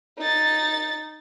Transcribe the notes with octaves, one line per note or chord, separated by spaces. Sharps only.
D#4 A6